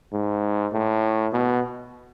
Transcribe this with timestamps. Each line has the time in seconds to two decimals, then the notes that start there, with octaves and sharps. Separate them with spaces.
0.13 G#2
0.73 A2
1.33 B2